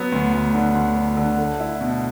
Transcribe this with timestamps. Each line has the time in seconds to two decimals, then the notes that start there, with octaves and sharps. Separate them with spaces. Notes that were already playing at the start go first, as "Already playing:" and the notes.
Already playing: F#3 B3
0.12 D2
0.33 D2
0.54 D3
0.75 D2
0.96 D3
1.17 D3
1.38 A3
1.60 E4
1.81 B2